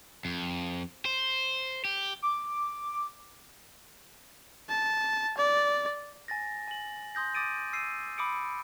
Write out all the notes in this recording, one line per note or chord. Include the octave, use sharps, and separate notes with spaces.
F2
C5
G4
D6
A5
D5
G#5 A6 A#6
G#5 F#7
C6 D#6 G6 A#6
D6 D#6 A6 D7 D#7
E6 C7 D#7
B5 D6 D#6 C#7 D7